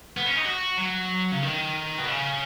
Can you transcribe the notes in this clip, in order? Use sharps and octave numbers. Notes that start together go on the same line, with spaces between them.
B3
C#4
D#4
F#4
F#3
C#3
D#3
B2
C#3